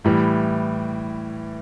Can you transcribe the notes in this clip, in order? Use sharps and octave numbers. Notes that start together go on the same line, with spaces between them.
A2 E3 G3